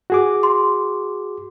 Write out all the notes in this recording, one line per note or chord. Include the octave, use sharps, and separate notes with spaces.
F#4 G#4 D6
C6